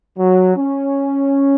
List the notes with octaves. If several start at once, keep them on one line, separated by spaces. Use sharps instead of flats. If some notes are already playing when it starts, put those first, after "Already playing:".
F#3
C#4